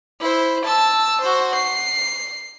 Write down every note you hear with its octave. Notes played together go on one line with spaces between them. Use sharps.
E4 C5
A5 E6
F#4 C5
C7